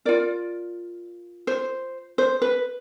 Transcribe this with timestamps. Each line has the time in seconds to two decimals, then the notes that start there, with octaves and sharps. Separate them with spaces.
0.05 F4 A#4 D5
1.47 C5
2.18 C5
2.42 B4